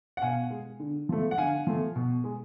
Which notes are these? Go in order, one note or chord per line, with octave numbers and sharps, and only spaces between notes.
F#5
B2 F5 G#5
G#3
D3
F3 A3
F#5
D3 F5 G#5
F3 A3
B2
G#3